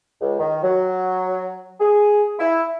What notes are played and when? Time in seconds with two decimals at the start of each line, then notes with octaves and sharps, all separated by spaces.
0.21 C#2
0.39 D#3
0.63 F#3
1.80 G#4
2.39 E4